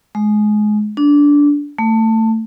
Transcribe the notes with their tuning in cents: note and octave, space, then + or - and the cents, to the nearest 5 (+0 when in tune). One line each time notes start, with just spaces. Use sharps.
G#3 +25
D4 -15
A3 +20